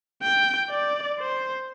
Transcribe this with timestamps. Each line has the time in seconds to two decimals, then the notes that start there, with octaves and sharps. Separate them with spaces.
0.23 G5
0.71 D5
1.19 C5